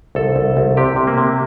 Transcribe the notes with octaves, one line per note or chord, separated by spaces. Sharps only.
C2 A4
C2
C2
C3 G4
C3
A#3
C3